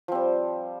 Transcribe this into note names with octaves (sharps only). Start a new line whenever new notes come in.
F3 G3 C4